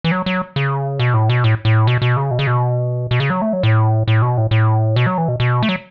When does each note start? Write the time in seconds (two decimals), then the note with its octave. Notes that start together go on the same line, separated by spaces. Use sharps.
0.04 E3
0.12 F#3
0.26 F#3
0.56 C#3
0.99 B2
1.14 A2
1.29 B2
1.44 A2
1.65 A2
1.87 B2
2.02 B2
2.17 C#3
2.31 B2
2.39 C#3
2.47 B2
3.11 B2
3.20 C#3
3.30 F#3
3.42 A3
3.53 F#3
3.63 A2
4.08 A2
4.22 B2
4.38 A2
4.51 A2
4.96 B2
5.07 F#3
5.18 E3
5.28 B2
5.40 B2
5.63 A3
5.69 F#3